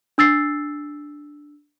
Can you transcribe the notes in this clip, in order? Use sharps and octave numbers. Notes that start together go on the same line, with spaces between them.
D4 E6 A6 C7